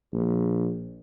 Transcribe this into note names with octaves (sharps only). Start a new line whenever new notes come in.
A#1